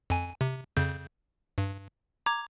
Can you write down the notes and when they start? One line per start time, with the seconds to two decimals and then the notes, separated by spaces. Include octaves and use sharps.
0.10 F2 G#5
0.41 C3
0.77 F2 C#3 G6
1.58 G2
2.26 A#5 D6 G#6